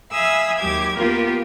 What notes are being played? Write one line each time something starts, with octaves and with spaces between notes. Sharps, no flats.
E5 F5 G#5 B5 D#6 E6
D#2 F#3 G4 D6 G#6
A#3 B3 F4 G4 A#4